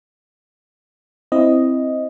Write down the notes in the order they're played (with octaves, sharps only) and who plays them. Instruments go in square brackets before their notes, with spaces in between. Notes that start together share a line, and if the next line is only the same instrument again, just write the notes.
[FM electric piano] C4 E4 D#5